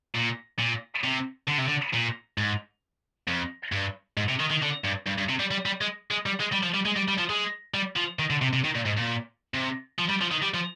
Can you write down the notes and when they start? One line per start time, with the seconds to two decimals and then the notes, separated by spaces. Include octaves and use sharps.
0.15 A#2
0.59 A#2
1.04 C3
1.48 D3
1.58 C3
1.68 D3
1.94 A#2
2.38 G#2
3.27 F2
3.72 G2
4.17 G#2
4.28 C3
4.40 D#3
4.50 D#3
4.62 D3
4.84 G2
5.06 G2
5.18 G2
5.29 C3
5.40 G3
5.51 G3
5.66 G3
5.81 G#3
6.11 G#3
6.26 G3
6.40 G#3
6.52 G3
6.63 F3
6.74 G3
6.85 G#3
6.96 G3
7.08 G3
7.18 F3
7.30 G#3
7.74 G3
7.96 F3
8.19 D#3
8.30 D3
8.42 C3
8.53 C3
8.65 D#3
8.75 A#2
8.86 G#2
8.98 A#2
9.54 C3
9.99 F3
10.09 G3
10.21 F3
10.31 D#3
10.42 G3
10.54 F3